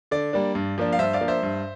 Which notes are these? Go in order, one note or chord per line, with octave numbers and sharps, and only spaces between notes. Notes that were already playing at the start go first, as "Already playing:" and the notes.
D3 D5
G3 A#3 D4
G2
F3 A#3 D4
F5
G2 C5 E5
D5 F5
F3 A#3 D4
C5 E5
G2